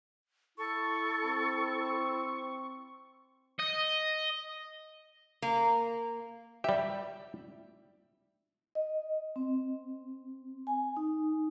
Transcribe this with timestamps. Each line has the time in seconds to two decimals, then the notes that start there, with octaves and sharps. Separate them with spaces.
0.58 E4 A4 C#6
1.24 C4
3.60 D#5
5.42 A#3
6.64 G3 G4 E5
8.75 D#5
9.36 C4
10.67 G#5
10.97 D#4